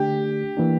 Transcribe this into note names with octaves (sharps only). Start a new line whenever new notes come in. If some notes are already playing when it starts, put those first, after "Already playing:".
Already playing: D3 A3 D4 G4
E3 A#3 D4